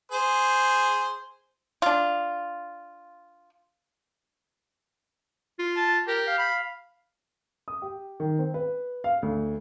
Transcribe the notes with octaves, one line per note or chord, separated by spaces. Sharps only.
G#4 C5
D4 F4
F4
A5
G4 A#4
F5
B5
D#6
G4
D#3
C4
B4
F5
D2